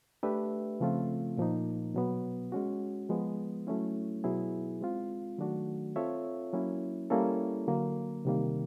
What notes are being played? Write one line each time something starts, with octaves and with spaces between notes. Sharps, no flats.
A3 D4 G4 B4 E5
C#3 F3 A3 C4 F4
A#2 F3 A#3 D#4
B2 F#3 B3
G#3 C#4 F#4
F3 G#3 B3
F#3 A3 C#4 E4
B2 F#3 B3 E4 G#4
G#3 C4 F4
D#3 F#3 A3 D4 F#4
C4 F4 A4 C#5 E5
F#3 A#3 C#4 E4
G3 A#3 C#4 E4 A4
D3 F#3 A#3
C3 D#3 G3 A#3